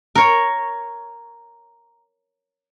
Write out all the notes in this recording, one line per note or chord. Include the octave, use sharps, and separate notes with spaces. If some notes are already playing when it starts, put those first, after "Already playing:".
A#4 C#5